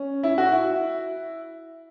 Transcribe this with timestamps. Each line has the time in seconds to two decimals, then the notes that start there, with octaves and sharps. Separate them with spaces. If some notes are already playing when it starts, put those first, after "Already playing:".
Already playing: C#4
0.23 E4
0.38 F#4
0.52 E4